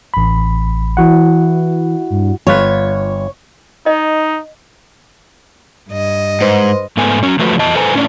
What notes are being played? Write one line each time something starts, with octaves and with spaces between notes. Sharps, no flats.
A1 B5
E3 E4 F#4 F#5
G2
G1 F4 B4 C#5
D#4 D#5
G2 D#5
G#2 B4 C5 C6
G#2 A3 B3 G#5
F#3 C#4
F3 F#3 A3 F#4 B4
E2 D#5 A5
A4 B4 C5 G#5 A#5
A2 C#4 D4